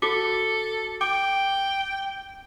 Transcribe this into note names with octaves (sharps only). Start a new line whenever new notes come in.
F#4 A4 D6
G5 D6